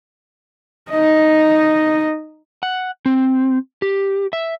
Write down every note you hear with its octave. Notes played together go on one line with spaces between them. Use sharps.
D#4 D#5
F#5
C4
G4
E5